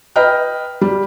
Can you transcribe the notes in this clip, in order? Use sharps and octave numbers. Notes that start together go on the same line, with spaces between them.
B4 D#5 G5 F6
G3